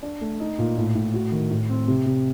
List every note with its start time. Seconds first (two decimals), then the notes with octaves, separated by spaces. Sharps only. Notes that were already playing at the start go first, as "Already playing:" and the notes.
0.03 D4
0.21 A3
0.40 D#4
0.58 A#2
0.77 A2
0.95 A2
1.14 F#4
1.32 D#3
1.51 A2
1.69 C4
1.88 C3
2.06 C3